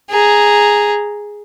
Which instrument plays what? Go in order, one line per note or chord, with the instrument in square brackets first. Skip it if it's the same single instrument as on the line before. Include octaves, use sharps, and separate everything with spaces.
[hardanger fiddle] G#4 A#5